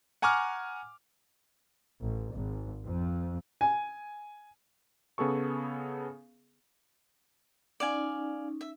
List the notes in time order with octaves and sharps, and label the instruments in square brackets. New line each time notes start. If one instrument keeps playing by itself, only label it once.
[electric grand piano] F#5 G#5 A#5 C#6 D6 F6
[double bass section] A1
G#1
F2
[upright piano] G#5
[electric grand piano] C#3 B3 G#4 A4 C#6
[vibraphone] C#4 D#4 [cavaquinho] D5 F5 G#5
[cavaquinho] E5